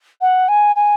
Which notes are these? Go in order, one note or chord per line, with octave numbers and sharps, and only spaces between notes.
F#5
G#5
G#5